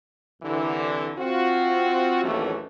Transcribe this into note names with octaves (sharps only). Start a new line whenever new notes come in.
C2 D3 E3
C4 F4 F#4
A#1 D#2 E3 F#3 A3 C#4